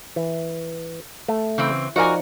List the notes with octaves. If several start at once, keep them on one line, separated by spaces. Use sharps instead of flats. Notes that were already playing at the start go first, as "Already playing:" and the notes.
E3
A3
C#3 E3 C4
F3 D#4 F#4 A#4 D5 G#5